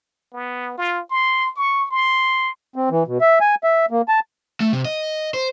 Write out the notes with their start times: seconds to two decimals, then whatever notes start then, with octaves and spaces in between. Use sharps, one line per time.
0.33 B3
0.78 F4
1.11 C6
1.56 C#6
1.91 C6
2.76 C4
2.91 E3
3.07 B2
3.21 E5
3.41 G#5
3.64 E5
3.91 A#3
4.08 A5
4.60 A3
4.73 C3
4.85 D#5
5.34 C5